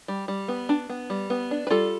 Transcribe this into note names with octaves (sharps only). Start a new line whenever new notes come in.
G3
G3
B3
D4
B3
G3
B3
D4
B4
G3 F4 A4